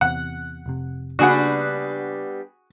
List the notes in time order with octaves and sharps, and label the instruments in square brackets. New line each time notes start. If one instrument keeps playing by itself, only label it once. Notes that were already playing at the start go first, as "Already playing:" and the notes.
[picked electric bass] E2 C3 [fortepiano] F#5
[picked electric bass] F1 C3
[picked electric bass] C#3 A#3 [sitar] G3 B3 D4 [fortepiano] F#4 G#4 F#5